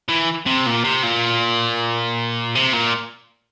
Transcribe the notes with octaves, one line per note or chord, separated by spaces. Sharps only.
E3
C3
A#2
C3
A#2
C3
A#2